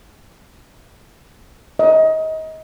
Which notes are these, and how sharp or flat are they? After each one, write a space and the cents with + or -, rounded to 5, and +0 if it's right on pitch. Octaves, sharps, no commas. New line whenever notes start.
D#5 +30